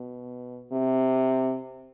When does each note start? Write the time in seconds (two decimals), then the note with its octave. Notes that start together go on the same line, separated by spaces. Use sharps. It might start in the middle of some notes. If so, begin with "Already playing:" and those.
Already playing: B2
0.72 C3